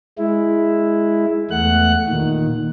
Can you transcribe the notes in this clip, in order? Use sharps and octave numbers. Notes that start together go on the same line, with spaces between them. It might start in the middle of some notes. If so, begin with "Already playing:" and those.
G#3 E4
E2 A3 F#5 F#6
A#2 D#3